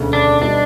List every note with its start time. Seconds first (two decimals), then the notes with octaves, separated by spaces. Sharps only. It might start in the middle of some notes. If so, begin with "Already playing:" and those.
Already playing: E1 D2 C#3
0.13 D4
0.41 B2 G3 B3 D4 D#4